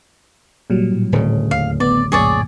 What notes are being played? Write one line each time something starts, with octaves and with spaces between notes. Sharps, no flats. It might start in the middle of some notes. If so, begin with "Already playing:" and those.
F1 A#2 F#3 G3
A2
D1 C#3
D#2 F5
G#1 B3 D5
C#2 F#2 A#2 G#4 C#5 D5